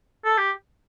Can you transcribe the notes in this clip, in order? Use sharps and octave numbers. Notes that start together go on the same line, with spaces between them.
A4
G4